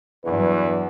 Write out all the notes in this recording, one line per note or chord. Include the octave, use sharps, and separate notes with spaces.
E2 G2 F#3 B4